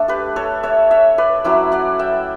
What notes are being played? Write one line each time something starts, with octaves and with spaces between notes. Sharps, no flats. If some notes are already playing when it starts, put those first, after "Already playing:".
Already playing: A3 D4 A4
G4 B4
A4 C#5
C#5 E5
C#5 E5
B4 D5
F#3 C#4 E4 B4 D5
D5 F#5
E5 G5